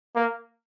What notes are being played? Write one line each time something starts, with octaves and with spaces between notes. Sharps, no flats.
A#3